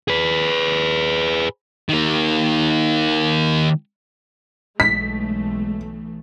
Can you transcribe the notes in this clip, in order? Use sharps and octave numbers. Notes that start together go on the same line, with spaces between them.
G#4 B4
D#3 A#3
B1 E3 G#3 A3 B6